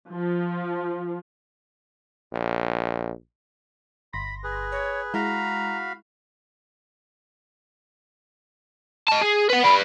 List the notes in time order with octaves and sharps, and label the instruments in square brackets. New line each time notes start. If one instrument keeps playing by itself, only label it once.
[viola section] F3
[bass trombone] A#1
[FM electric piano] G1 C6 A#6 [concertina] B5
[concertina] G#4 B4
[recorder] C#5
[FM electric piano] G#3 E4 [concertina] F#4 F5 B5 [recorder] A#5
[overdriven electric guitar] D#5 A5
G#4
B4 F#5
[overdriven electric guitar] B4 D5 [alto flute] B5